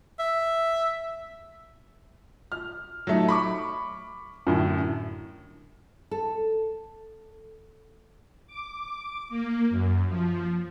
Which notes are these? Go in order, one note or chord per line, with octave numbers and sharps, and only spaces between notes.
E5
F6
F#3 A3 D#4
B5 C#6 D6
F#2 A2 D3
A4
D6
A#3
F#2
F3